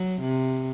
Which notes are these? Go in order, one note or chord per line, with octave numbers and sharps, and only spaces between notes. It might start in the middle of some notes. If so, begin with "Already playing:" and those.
Already playing: F#3
C3